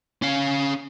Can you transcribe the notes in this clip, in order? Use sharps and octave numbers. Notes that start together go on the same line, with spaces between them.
C#4 F5